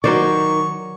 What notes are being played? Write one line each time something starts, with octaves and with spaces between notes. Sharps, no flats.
D#3 F#3 C5 D5 C#6